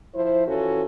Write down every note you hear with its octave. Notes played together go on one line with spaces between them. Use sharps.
F3 E4 C5
E3 C#4 F4 F#4 A4